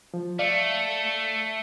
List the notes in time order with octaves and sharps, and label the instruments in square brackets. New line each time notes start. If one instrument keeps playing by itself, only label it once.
[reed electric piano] F3
[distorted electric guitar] A3 [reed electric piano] D5 F5